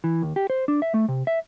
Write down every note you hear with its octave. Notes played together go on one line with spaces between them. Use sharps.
E3
D#2
G4
C5
D4
E5
A3
C3
E5